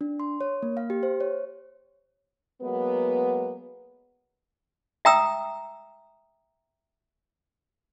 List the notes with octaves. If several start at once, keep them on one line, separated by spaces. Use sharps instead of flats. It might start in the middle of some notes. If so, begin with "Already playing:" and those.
D4
C6
C#5
A#3
F5
G4
C5
C#5
F#3 G#3 A#3 B3
E5 G5 A#5 D#6 E6